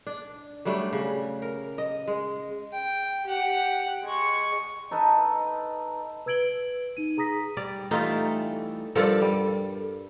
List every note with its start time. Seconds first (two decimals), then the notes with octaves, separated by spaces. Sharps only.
0.07 D4
0.65 F#3 G3 A3 D4
0.93 C#3
1.42 A#4
1.78 D#5
2.08 G#3
2.73 G5
3.24 G4 F#5
4.03 G#3 C#6
4.91 D#4 A4 B4
6.26 B4 E6 G#6 D7 F#7 G7
6.97 D#4 D#7
7.17 G#4 A#5 D#6 A#6 B6
7.57 G3 D5
7.91 E3 G3 A3 D#4 F4
8.95 G2 F3 A4 A#4 D5
9.22 G3